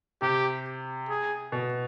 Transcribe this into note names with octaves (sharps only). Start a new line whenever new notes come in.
C3 G4
G#4
B2